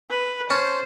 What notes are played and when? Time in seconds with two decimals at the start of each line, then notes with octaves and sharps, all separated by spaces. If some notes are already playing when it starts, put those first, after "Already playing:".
0.10 B4
0.50 C#4 C5 A5